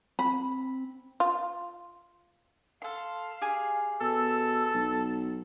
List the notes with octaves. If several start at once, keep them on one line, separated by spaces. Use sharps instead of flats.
C4 B5
F4
A4 F5 C6
G4 G#4 G#5
B2 A4 E6
B1